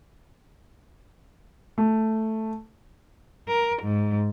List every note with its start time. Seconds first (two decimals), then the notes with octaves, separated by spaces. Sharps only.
1.78 A3
3.47 A#4
3.83 G#2